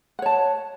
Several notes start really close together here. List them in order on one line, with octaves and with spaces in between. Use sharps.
F#5 C#5 A5